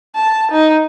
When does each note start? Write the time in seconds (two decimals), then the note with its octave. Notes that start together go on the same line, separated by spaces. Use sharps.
0.16 A5
0.52 D#4